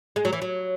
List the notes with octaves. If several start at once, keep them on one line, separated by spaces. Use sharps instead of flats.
G#3
F#3
E3
F#3